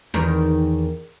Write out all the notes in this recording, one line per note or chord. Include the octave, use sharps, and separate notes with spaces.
E2 D#3 A#4